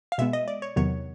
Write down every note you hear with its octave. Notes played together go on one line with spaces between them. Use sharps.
F5
B2 G#3 B3 E5
D#5
D5
C#5
E2 C3 D#3 F#3 B3 C#5